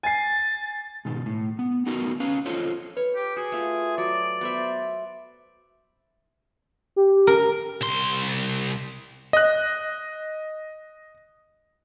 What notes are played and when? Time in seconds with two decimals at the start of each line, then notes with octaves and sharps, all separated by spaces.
0.03 G#5 A6 C7
1.05 G#2 B2 D#3
1.26 A2
1.59 B3
1.86 A3 B3 D#4 F#4 A#4
2.20 C#4 B4 F5
2.46 F4 A4 C5 C#5 D#5
2.97 B4 C#5
3.16 G4
3.36 F#4 G#4
3.52 A3 F4
3.98 F#3 D5
4.41 B3 C5 E5
6.96 G4
7.27 A#4
7.81 C2 C6
9.33 D#5 F#6